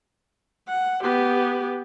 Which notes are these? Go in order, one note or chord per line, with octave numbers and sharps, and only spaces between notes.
F#5
B3 G4